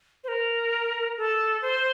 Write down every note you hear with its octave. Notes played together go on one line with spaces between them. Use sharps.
C5
A#4
A4
C5